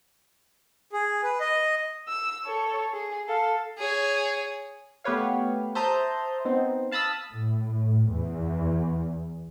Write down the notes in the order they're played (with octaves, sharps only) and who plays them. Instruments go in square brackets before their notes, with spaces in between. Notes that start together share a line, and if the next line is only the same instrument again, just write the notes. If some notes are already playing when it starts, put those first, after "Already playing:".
[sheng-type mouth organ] G#4
B4
D#5
[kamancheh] E6
A4 C#5
G#4
A4 F5
[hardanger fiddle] G#4 C#5
[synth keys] A3 B3 G4 B4 C#5 F5
C5 E5 A5 A#5 D#6 G6
B3 C4 D#4
F5 A5 B5 D#6 E6
[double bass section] A2
E2